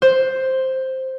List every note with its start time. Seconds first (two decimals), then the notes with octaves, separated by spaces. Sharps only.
0.02 C5